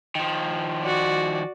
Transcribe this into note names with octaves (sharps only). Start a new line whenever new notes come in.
D#3 F3
F#4 D5